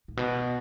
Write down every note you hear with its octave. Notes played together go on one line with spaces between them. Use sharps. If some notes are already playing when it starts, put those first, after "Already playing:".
A2
B2